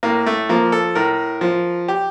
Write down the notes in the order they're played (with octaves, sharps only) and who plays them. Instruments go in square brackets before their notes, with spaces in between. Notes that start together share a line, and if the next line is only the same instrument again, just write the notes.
[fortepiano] A2 A#3
A3
F3 A#3
A4
A2 A#4
F3
G4